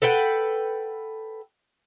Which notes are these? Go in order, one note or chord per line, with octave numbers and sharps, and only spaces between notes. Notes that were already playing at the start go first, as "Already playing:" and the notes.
A4 B4 F#5 G5